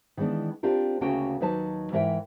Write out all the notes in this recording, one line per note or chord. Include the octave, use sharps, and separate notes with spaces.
D#3 E3 G#3 B3 D4
C4 D4 F4 G4 A#4
D2 C#3 A#3 C#4 F#4 G5
D#2 F#3 D#4 B4 D#5 A5
G#2 E3 A#4 D5 E5 G5